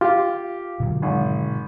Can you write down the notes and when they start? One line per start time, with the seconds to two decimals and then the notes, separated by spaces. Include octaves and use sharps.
0.01 F4 G4 F5
0.80 B2 D3 F#3
1.02 G#1